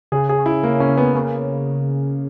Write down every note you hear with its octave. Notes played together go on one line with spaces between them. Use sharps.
C#3 G#4
G#4
C#3
E4
C#3 A#3
C#4
C#3
B3
C#3 A#3